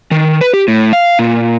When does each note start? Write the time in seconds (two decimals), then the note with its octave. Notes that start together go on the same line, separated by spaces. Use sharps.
0.11 D#3
0.41 B4
0.54 G4
0.68 A2
0.93 F5
1.19 A#2